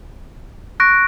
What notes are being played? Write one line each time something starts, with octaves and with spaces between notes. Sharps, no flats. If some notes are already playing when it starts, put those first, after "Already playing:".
C#6 F#6 A#6 D7